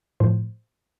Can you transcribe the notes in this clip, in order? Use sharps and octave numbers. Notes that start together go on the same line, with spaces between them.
A2 F3 C5